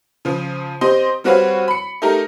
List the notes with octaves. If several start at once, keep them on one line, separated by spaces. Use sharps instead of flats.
C#3 F3
C4 G4 D#5 C6
G3 C4 F#4 B4 C#5 F5
B5 C#7
A3 D#4 G4 A#4